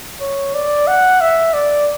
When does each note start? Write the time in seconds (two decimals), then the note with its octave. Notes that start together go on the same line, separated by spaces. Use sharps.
0.21 C#5
0.54 D5
0.88 F#5
1.21 E5
1.54 D5